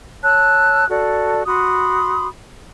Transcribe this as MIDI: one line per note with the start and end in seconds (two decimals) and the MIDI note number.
0.23 0.85 73
0.23 0.85 81
0.23 0.85 88
0.23 0.85 90
0.89 1.43 66
0.89 1.43 69
0.89 1.43 74
1.46 2.27 66
1.46 2.27 83
1.46 2.27 84
1.46 2.27 87